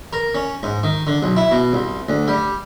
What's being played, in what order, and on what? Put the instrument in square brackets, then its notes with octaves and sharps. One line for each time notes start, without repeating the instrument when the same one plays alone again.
[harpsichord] A#4
C#4
G#2
D#3
D3
B1
E4
B2
C2
D2
G3